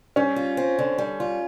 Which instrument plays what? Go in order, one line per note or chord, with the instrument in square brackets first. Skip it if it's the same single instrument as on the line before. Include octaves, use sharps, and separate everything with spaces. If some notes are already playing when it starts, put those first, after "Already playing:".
[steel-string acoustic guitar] G3 [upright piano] C#4
[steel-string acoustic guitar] F4
C4
D3
G3
F4